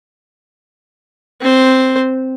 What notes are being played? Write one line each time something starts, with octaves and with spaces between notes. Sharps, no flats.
C4 C5